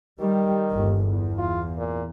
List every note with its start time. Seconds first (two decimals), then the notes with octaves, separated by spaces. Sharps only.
0.20 D#3 G3
0.73 G1 D#2
1.08 E2
1.38 F4
1.78 A#2